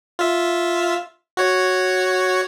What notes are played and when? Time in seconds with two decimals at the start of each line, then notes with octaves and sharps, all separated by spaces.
0.19 F4 E5
1.37 F#4 C#5